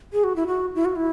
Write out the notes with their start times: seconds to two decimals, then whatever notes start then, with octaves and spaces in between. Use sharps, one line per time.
0.13 G#4
0.24 F#4
0.36 E4
0.47 F#4
0.75 E4
0.85 F#4
0.96 E4